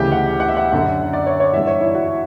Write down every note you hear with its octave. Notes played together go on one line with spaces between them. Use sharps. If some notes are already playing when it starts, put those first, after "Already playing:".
Already playing: D2 C#3 E3 G4
F#5
F#5
E5
F#5
F#2 D3
D5
C#5
C#5
G2 E3 E5
C#5
E4
F#4